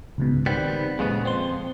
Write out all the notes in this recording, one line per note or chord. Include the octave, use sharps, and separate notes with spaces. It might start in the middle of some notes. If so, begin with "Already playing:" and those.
C#2 G#2 B2
D#3 G3 B3 C4
F2 A#2 C#3 G#3 B3
F2 C4 C6